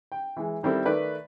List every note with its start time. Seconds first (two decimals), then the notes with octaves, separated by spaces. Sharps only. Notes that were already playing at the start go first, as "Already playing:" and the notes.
0.12 G5
0.37 E3 G#3
0.63 D#3 G3 C4 E4 A4
0.85 D#3 A3 B4 D5